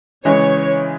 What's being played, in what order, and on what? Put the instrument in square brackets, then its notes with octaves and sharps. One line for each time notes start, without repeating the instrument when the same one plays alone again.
[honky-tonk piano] C#3 E3 G#3 [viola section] C#5